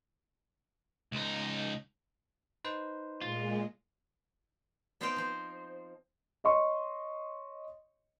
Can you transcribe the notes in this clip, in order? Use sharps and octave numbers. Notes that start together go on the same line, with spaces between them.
C#2 D#4
D#4 B4 C5
A#2 G#3 F4
B3 C4 D#4 C5 F5 G5
F3 C5
C#5 D#5 C6 C#6